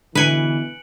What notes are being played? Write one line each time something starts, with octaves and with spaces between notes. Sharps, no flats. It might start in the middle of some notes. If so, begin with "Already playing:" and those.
B2 D3 E3 B4 G#5 C#7 D7 F#7